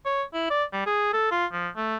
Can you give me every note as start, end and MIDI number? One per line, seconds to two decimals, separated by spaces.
0.06 0.23 73
0.34 0.48 64
0.50 0.64 74
0.73 0.85 55
0.86 1.12 68
1.13 1.29 69
1.31 1.46 65
1.53 1.68 53
1.76 1.97 57